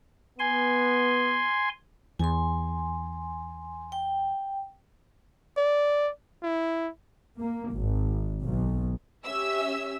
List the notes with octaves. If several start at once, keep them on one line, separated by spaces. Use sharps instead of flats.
B3 G#5 C6
E2 G#5 C6
G5
D5
E4
A#3
G#1
B1
C#4 G4 E5 E6